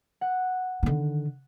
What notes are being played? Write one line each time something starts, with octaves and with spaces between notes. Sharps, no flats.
F#5
D3 D#3